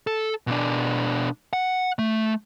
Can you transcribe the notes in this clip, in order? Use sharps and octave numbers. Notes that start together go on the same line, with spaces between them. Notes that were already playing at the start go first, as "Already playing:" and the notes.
A4
B2 D4
F#5
A3